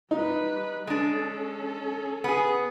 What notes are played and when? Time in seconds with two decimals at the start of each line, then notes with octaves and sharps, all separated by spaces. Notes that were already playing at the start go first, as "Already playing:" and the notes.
0.11 G3 D#4 B4
0.87 G#3 C#4 D4 A4
2.24 B3 G#4